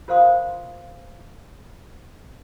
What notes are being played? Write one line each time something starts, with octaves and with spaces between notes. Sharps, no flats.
F4 A#4 C5 F5 C6 D#6